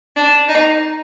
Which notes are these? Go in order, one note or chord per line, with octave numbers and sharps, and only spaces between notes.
D4
D#4